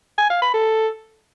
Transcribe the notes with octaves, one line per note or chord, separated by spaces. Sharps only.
G#5
F5
B5
A4